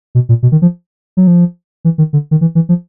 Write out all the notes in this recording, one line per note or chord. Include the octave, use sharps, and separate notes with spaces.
B2
A#2
B2
D#3
F3
F#3
F3
E3
D#3
D3
D#3
E3
E3
F3